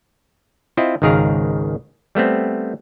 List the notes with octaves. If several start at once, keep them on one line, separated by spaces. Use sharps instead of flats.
C4 E4 F4 D#5
G#1 C#2 D#3 G#4 A#4 F5
G3 A3 B3 C4